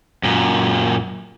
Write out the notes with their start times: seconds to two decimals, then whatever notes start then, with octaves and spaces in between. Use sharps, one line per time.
0.23 F#2 A#2